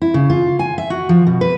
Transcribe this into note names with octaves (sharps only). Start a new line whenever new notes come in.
E4
C#3
F4
G#5
E5
F#4
F3
B2
B4